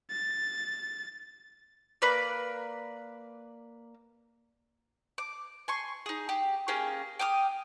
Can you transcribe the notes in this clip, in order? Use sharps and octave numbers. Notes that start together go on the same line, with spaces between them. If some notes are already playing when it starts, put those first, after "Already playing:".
A6
A#3 B4 D5
D6
G#5 C6 C#6
D#4 G#4
G4
A#3 C#4 G4 G#4
G5 D6 D#6 F6